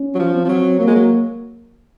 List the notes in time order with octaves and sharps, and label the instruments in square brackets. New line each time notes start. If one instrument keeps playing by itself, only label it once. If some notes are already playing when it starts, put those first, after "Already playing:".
Already playing: [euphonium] C#4
[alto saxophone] F#3
F3
[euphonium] C4
[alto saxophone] F3
F#3
[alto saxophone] F#3 [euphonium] A#3
[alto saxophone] G#3
F#3